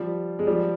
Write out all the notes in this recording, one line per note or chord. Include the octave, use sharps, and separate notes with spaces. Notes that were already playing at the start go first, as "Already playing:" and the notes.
Already playing: F3 G3
G#3
F3 G3